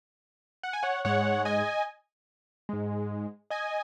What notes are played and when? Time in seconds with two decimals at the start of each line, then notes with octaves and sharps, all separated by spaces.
0.63 F#5
0.73 G#5
0.83 C#5 F#5
1.05 G#2 G#3 C#5 F#5
1.45 D#5 G#5
2.69 G#2 G#3
3.50 D#5 G#5